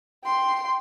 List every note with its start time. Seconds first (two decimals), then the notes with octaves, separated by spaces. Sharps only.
0.24 G5 C6